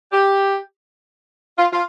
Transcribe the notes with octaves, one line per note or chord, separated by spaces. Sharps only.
G4
F4
F4